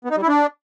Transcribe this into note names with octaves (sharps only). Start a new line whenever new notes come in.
B3
D#4
G3
E4
D4